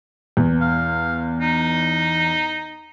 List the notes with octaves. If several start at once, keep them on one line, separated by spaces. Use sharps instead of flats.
E2
F5
D#4